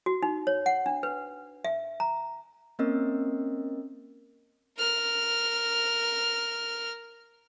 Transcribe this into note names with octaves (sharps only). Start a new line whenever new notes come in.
F#4
D#4
C#5
F#5
D4
B4
E5
A#5
A#3 C4 C#4 A#4 D#5
A#4 F6